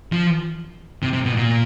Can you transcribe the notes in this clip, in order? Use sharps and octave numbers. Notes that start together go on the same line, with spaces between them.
F3
C3
C3
B2
A#2